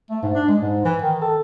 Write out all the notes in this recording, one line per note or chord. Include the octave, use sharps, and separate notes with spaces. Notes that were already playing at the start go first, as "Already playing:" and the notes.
A3
G#2
D4
G#3
G#2
E3
D#3
A4